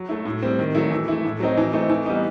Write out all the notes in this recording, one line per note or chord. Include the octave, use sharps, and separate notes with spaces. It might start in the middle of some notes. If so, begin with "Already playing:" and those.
Already playing: F#3
A3 E4
A2
G3 C4
D#3
F#3 A3 E4
E3
A3 E4
A2
F#3 C4 D#4
E3
A3 C4 D#4
E3
G3 B3 D#4